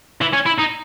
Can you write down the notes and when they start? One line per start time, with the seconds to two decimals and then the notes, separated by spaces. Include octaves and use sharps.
0.21 E3
0.33 C#4
0.46 E4
0.58 D#4